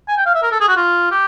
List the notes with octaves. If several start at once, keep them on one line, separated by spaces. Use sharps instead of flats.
G#5
G5
F5
E5
A#4
A4
G#4
F#4
F4
G4